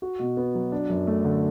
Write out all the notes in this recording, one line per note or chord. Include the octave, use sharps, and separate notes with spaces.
F#4
B2
B3
F#3
D4
F#2
A3
D3